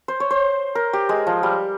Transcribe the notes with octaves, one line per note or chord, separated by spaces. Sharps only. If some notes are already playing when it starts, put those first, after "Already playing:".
C5
C#5
C5
A#4
G4
G#3
F3
G3